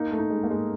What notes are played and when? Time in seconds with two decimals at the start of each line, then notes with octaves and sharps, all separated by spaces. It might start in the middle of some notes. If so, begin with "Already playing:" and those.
Already playing: A#3 D#4
0.11 A3
0.18 D#4
0.30 G#3
0.43 A3 A#3
0.50 G#3